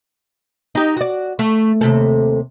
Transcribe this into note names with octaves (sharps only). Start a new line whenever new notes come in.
D#4 G4
F#4 D5
A3
D#2 C3 A4